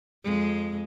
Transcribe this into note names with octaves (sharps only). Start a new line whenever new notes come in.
F2 G#3